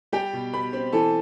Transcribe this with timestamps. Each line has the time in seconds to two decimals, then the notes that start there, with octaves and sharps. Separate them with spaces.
0.12 G3 G4 G5
0.33 B2
0.53 B2 B4 B5
0.73 C4
0.92 E3 A4 A5